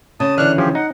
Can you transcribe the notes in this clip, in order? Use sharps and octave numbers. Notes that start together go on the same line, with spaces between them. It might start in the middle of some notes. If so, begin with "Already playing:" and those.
C#3 A5 D#6
D3 E3 D4 F6 F#6
F3 G4 G#4
D#4 F#5